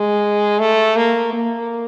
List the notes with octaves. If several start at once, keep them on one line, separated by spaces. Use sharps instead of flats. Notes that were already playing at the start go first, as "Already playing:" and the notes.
Already playing: G#3
A3
A#3
A#3